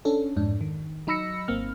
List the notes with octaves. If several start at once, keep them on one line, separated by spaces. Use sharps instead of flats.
C#4 D4 A4
F2 G#2 D4
D#3
F#3 D#4 B5 E6 A#6 C#7
G#1 A#3 C4 F6